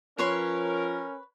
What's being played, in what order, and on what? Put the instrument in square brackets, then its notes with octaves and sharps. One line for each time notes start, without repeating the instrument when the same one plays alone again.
[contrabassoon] F3 [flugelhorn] C#4 [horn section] A#4 [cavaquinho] B4 C#5 C6